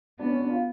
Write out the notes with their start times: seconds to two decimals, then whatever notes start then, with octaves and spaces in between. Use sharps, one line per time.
0.19 B3 D4
0.29 C#4
0.40 D4
0.50 F4